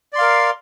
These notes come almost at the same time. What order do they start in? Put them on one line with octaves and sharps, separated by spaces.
D5 C6 F5 A#4